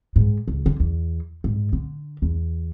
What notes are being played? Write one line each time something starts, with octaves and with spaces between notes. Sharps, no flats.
G#2
C#2
D3
E2
G#2
D3
E2